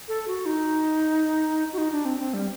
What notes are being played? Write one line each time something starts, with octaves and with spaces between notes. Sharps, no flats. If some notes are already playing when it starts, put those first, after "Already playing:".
A4
F#4
D#4
F#4
D#4
D4
C4
C4
G3